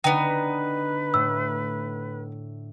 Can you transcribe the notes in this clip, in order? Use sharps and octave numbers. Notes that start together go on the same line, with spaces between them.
D3 B3 D#4 B4 G5
A2 E6